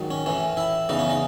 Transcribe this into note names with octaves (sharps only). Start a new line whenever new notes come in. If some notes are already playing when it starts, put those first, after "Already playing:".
Already playing: G#2 D#3 F#3
C#4
A2 E3 C#4
E4
E2 C#3 E3 D#4
C#4
D#4